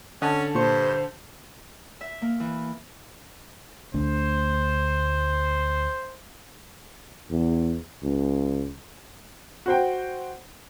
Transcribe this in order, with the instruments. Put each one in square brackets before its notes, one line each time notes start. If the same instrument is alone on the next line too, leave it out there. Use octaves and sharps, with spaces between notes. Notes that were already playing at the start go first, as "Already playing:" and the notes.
[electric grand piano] D3 A5 [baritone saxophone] C#4 [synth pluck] D#5 F#5
[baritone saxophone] G2 [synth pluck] A#2 C6 C#6 [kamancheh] C5
[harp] E5
A#3
E3
[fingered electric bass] D2 A3 D4 [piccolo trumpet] C5
[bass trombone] E2
C#2
[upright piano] F#4 C5 G5